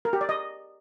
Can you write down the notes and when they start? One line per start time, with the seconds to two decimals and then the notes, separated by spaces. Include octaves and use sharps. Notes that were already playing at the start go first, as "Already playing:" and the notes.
0.05 A#4
0.13 G4
0.21 D5
0.29 D#5